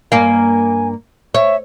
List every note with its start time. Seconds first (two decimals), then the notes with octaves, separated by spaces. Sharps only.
0.12 G2 A#3 F5 G#5
1.34 C#5 E5